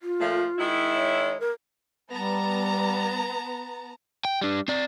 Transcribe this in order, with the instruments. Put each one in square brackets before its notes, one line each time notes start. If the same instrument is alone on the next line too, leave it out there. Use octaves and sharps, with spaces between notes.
[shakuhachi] F4
[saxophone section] A#2 F3 A3
D#3 G#3 E4
[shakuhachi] C#5
A#4
[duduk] G3 [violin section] B3 A5 A#5
[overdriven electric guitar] G5
G3 D4
C4 D5